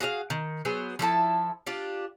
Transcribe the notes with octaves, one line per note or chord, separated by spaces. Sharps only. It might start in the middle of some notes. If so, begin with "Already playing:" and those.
F#4 G#4 D#5 F5
D#3
F#3 B3 G#4 C5
F3 E4 A4 A5
D4 F4 G4